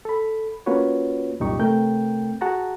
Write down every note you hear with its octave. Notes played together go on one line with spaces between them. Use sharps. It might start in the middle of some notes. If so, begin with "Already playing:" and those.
A4 B5
A#3 C#4 F4 F#4 B4 C#5
C2 F#2 A#2 D#4 G4 C#6
C3 A3 C4 A#4 G5 G6
F#4 G#4 F#5 A5 A#5